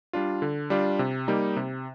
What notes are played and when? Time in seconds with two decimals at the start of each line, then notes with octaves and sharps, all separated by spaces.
0.13 G3 D4 F4
0.42 D3
0.70 G3 D4 F4
0.99 C3
1.28 G3 A#3 D#4
1.56 C3